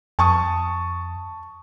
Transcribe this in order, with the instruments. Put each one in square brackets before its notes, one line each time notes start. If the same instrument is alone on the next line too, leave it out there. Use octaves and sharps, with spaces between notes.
[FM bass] F2 [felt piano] A5 C#6 D#6